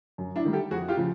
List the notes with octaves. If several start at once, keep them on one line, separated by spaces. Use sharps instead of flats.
F#2
D4 E4
D#3 G3
G4 A4
F2 F#4 G#4
F4 G4
C#3 F3